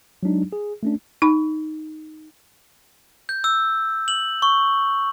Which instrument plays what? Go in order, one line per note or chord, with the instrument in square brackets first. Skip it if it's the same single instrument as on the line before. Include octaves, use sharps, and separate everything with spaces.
[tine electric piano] F#3 G#3 D4 D#4
G#4
A3 C#4 D4
[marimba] D#4 B5
[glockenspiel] G6
E6
F#7
C#6